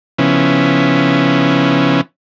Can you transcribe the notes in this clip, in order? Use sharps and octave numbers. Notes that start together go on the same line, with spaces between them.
C#3 F3 B3 C#4 E4